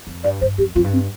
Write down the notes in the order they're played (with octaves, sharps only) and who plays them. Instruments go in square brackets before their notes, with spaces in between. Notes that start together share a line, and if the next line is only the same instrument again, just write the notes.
[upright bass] F2
[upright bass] G2 [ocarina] D5
[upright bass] G2 [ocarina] C5
[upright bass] F2 [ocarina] G4
[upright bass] F2 [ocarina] F4
[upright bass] G2
[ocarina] C4